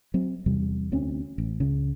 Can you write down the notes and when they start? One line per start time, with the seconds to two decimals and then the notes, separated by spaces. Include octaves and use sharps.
0.14 F#3 C4
0.46 E2 C3 G3
0.92 D2 C4 C#4
1.38 A1
1.60 C#2 C#3